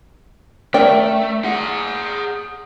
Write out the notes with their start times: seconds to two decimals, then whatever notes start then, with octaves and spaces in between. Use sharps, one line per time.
0.74 A3 A#4 D5 G5
1.44 G#4 F#5